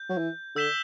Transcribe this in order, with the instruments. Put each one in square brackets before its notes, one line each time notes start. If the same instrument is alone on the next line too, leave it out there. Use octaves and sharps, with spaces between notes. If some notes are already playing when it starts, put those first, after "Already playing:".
Already playing: [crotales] G6
[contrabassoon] F#3
E3
[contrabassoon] D3 [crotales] E6 G6 B6 E7 G7